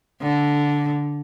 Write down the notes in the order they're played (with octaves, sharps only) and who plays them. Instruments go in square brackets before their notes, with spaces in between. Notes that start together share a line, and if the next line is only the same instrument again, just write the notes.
[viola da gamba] D3